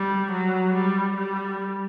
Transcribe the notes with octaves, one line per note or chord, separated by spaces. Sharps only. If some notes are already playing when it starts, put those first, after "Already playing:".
Already playing: G3
F#3
G3
G3